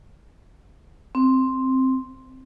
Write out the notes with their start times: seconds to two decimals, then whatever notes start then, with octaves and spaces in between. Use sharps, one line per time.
1.15 C4